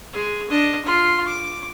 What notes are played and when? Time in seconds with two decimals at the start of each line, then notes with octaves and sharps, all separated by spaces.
0.13 G#3 G#4
0.50 D4 D#5
0.86 F4 C6
1.27 D6